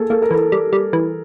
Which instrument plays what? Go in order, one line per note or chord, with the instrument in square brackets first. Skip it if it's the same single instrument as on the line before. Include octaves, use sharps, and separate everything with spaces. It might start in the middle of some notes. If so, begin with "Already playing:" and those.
Already playing: [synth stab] A#3 [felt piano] G#4 A4
[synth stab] A#3 [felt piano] A4
[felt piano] A#4
[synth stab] E3 [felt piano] A4
[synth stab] G3
G3
E3